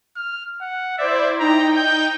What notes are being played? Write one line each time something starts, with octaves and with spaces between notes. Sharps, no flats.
F6
F#5
E4 C5 D5 E5
D#4 G5 A#5
G6